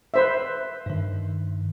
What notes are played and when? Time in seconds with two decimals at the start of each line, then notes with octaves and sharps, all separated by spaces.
0.14 B4 C5 E5
0.86 G2 D#3